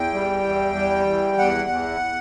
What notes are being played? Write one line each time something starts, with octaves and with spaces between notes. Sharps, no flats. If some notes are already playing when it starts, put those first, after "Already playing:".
Already playing: E2 G5
G3
E2
G3
E2
E2 F#5
E2